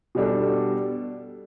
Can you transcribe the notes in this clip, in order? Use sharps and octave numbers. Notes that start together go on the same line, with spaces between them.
B2 G3 D4 A4